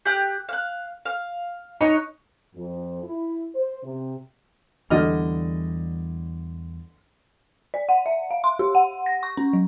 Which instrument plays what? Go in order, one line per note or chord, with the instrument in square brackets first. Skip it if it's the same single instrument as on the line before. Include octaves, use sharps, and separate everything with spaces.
[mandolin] G4 F#6
F5 F#6
F5
[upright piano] D#4 [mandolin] C#5 F#6
[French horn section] F2
E4
C5
C3
[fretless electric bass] E2 E3 G3 [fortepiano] D3 D#5 F6
[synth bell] D5
F#5
E5
F5
C6
G4
F#5
A#6
C#6
C#4
F#3